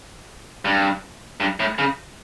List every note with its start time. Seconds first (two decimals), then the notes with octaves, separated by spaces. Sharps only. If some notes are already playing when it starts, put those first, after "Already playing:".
0.65 G2
1.40 G2
1.60 A2
1.78 C#3